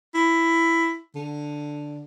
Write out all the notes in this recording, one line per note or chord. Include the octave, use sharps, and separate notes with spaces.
E4
D3